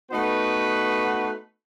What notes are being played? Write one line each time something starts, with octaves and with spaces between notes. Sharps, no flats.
A3 B3 D#4 F#4 B4